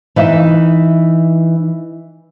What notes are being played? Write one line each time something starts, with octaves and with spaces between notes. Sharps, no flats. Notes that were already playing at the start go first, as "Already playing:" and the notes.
E3 D#4 E5